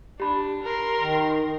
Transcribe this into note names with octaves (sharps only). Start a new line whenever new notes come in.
D4 G4 B5
A#4 C6
D#3